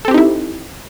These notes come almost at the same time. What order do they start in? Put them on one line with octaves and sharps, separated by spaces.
A4 C4 G4 D#4 E4